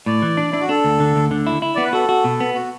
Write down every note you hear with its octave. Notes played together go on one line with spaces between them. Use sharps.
A2 D5
E3
D4
D4 E4
F#4
D4 A4
D2
D3
D2
D3
E4
E4
B3 D5
B4
F#4 A4
F#4
B2
B3
F#4